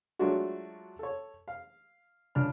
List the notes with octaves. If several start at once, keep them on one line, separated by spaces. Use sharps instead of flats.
F#3 G#3 A3 D4 F4 F#4
A4 C#5
F5
C#2 D4 F6